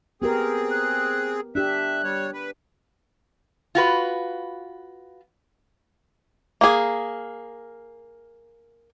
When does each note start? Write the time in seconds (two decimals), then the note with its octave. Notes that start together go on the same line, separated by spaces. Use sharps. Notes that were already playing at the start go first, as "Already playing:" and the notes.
0.22 B3 C4 G4 G#4 A#4
0.71 F#6
1.55 D4 G4 E5 F#6
2.04 G3 C#5
2.33 B4
3.75 F4 F#4 B4
6.61 A#3 G#4